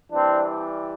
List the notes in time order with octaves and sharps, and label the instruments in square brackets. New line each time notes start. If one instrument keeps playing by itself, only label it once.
[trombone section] E3 G3 C4 D4